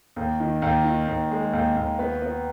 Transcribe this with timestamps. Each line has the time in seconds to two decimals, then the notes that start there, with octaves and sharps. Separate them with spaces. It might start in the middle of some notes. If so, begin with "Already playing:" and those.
0.16 D#2
0.40 D#3
0.62 D#2
0.85 D#3
1.08 D#2
1.31 G#3
1.53 D#2
1.76 D#2
1.99 B3
2.22 B3